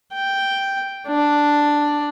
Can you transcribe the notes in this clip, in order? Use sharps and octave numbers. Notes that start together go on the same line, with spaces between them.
G5
D4